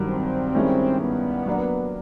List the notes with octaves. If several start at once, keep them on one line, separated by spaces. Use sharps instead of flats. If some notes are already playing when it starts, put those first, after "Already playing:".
Already playing: G2 D#3 F#3
C4
G2 D#3 G#3 C#4 E4
B3
F#3 A#3 D4